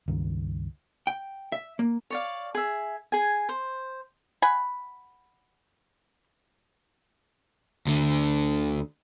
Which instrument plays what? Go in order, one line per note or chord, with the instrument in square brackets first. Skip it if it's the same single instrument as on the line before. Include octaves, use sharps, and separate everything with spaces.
[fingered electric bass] C#2 G2 D#3
[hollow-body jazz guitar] G5
E5
A#3
[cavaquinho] C#5 D5 F5
G#4 E5
G#4 G#5
C5
[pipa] F#5 G#5 B5
[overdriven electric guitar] D2 D3